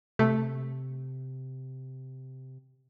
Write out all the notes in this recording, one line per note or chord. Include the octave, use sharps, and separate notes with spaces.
C3 A3